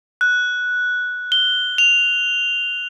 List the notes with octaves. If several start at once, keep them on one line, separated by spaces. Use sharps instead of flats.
F#6
G7
F7